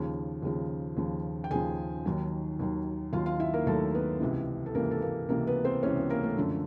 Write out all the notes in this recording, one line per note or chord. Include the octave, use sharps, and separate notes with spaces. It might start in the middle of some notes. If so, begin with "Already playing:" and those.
Already playing: D#2 C#3 F3
D#2 C#3 F3
D#2 C#3 F3
G5
D#2 C#3 F3 G#4 G#5
D#2 D#3 F#3
D#2 D#3 F#3
D#2 D#3 F#3 F4 F5
F4 F5
E4 E5
A#3 A#4
D#2 D#3 F#3 A3 A4
B3 B4
C#2 C3 E3
A4
C#2 C3 E3 A#3 A#4
A4
A#3 A#4
C#2 C3 E3 A#3 A#4
B3 B4
C4 C5
C#2 C3 E3 C#4 C#5
B3 B4
A#3 A#4
A3 A4
F#2 D3 F3